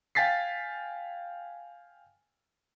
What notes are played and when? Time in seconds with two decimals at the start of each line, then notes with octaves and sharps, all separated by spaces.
0.15 F5 G5 G#5 A6 B6 C7